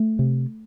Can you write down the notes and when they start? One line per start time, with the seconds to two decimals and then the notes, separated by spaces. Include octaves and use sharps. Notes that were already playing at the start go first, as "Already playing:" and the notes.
Already playing: A3
0.19 C3